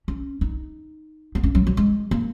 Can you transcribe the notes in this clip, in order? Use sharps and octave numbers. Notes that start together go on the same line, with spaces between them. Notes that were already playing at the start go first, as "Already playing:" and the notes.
C#4
D#4
B3
C#4
F#3
F#3
G#3
A#3